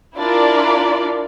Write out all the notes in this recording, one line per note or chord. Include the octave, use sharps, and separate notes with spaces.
D4 E4 F4 A#4 D5